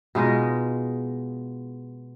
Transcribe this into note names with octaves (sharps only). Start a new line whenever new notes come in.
B2 G#3 D#4 F4